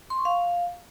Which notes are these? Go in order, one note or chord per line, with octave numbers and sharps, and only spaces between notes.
C6
C#6
F5